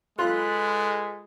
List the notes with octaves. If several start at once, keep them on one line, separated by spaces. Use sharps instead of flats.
G#3 F4 A4 B4 B5 F#6